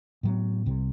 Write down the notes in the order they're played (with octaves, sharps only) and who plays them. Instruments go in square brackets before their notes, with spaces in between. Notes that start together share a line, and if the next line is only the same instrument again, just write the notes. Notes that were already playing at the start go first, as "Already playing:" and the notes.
[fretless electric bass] A2 F#3 B3
C2 C3 G3